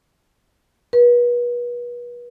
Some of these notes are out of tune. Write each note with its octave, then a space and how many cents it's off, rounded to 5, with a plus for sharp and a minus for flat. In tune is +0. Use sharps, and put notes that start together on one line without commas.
B4 -35